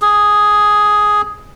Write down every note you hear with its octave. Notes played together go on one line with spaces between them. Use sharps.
G#4